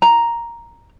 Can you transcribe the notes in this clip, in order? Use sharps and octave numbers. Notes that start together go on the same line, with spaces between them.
A#5